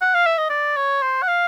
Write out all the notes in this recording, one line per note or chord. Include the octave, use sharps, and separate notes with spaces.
F#5
F5
E5
D#5
D5
C#5
C5
F#5
F5